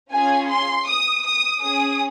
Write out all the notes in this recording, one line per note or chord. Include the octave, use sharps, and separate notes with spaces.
C#4 F4 G#4 G#5
C6
D#6
D#6
C#4 G#4 D#6